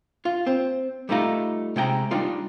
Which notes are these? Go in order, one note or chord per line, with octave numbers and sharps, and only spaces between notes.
F4
C4
G3 A3 D#4 F4 A#5
C3 G#3 G5 A#5
G3 D4 D#4 F4 D5